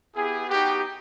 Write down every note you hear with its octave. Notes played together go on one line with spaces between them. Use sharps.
B3 E4 G4 G#4
B3 D#4 F#4 G4